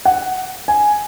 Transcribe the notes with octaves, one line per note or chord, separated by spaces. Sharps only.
F#5
G#5